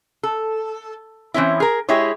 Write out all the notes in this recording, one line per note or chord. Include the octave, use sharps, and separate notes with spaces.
A4
E3 C4 C#4 E4
G#4 A#4
G#3 E4 G4 G#4 C#5